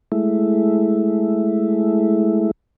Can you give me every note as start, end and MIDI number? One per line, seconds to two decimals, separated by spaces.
0.12 2.51 56
0.12 2.51 57
0.12 2.51 64